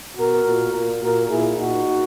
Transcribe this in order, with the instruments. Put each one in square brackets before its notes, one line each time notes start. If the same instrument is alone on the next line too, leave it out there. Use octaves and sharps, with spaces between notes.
[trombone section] B2 F#4 A#4
A#2
A#2
A#2 F#4 A#4
A#2 E4 G#4
A#2 D#4 F#4